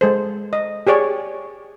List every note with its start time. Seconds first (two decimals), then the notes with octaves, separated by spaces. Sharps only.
0.01 G#3 A4 C5
0.53 D#5
0.87 G4 G#4 C#5 D5